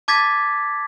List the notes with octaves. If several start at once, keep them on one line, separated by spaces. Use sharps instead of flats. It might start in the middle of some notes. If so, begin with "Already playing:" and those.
A5 D6 G#6 A6 B6